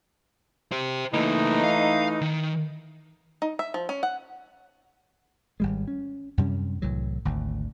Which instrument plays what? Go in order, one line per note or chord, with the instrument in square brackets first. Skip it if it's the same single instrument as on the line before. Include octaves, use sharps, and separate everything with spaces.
[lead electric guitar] G4 C5
[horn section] E3 A3 D#4 [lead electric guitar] A#3 E4
[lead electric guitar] F5
D#3
[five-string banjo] D#4
E5
F3
C#4
F#5
[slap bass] G#1 G3 G#3
C#4
F#2 C3 G3 C#4
C2 A2 E3 F#3
G#1 D2